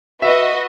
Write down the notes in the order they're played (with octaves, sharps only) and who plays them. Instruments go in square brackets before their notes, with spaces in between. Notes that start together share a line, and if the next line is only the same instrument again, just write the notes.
[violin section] F#4 B4 D#5 [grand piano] E5